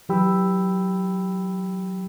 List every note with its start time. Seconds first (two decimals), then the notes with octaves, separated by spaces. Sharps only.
0.09 E3 F#3 G4 G5 B5 E6